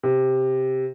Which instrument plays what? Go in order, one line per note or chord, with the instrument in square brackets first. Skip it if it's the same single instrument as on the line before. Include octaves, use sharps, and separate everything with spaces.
[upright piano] C3